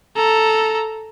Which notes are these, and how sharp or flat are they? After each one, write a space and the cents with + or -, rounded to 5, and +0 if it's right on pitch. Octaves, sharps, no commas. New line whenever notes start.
A4 +0 A#5 +0